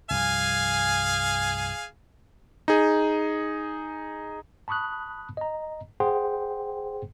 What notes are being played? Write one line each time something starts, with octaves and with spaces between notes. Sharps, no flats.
C2 G2 F3 G#4 F5 G#5
D#4 G#4
A5 B5 C#6 D#6 F#6
D#5 A#5
G#4 C5 F#5 G5 C6